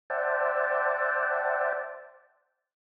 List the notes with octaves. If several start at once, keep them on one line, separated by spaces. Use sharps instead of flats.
C5 D5 E5 F#5 G5 A5